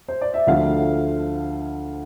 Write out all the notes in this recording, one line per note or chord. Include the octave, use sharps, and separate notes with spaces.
C5
D5
E5
D2 D3 F3 A3 F5